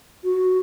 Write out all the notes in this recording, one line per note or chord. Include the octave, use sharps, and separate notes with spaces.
F#4